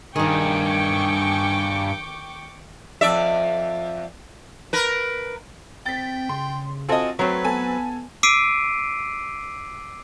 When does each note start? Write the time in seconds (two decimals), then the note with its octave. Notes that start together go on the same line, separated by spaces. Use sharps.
0.16 G2 D#3 D#4 G#4 G5 C#6 D6
3.01 F2 D5 E5
4.73 A#4 B4
5.86 C4 G5 A6 B6
6.29 C#3 C6
6.89 C4 F4 F#4 A4 D#5 G#5
7.19 F#3 A3 C4 F#4 B4 C#5
7.45 B3 A4 G#5
8.23 D6 E6 B6 C7 D7 D#7